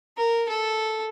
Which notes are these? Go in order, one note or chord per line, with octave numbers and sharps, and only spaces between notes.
A#4
A4